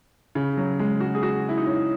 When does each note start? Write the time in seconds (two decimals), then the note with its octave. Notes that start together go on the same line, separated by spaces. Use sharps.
0.35 C#3
0.57 F#3
0.79 G#3
1.00 F#4
1.15 G#4
1.23 F#4
1.49 E4
1.57 D#4
1.66 C#4